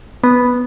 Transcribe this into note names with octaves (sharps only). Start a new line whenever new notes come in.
B3